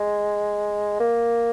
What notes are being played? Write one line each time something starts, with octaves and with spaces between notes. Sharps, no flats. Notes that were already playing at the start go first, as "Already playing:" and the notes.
Already playing: G#3
A#3